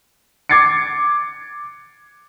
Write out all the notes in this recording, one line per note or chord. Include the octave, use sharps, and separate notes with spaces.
D6 G#6 A6 C7 C#7